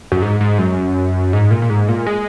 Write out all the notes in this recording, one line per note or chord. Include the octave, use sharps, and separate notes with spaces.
F#2
G#2
G#2
F#2
G#2
A#2
A#2
G#2
A#2
G#3